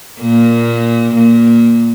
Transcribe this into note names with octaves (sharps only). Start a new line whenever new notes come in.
A#2 A#3
A#2 A#3